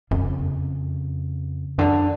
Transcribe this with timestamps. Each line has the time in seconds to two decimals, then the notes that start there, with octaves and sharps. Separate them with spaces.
0.11 F#2 C#3
0.26 F2
0.39 E2
0.52 F2
1.78 F#2 D3